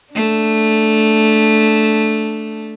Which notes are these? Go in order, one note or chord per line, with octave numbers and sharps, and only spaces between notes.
A3 D4